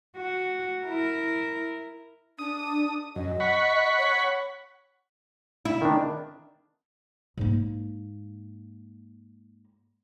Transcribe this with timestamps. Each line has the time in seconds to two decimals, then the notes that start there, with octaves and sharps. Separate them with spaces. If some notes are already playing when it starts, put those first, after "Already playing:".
0.17 F#4
0.86 E4 A#4
2.39 D4 D#6
3.16 F#2 D#5
3.40 F#5 B5 C#6
3.98 C#5
5.65 E4
5.82 D#3 D4
7.37 G#2 A#3